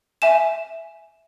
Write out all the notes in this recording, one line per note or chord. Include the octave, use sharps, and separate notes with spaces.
E5 G#5 E7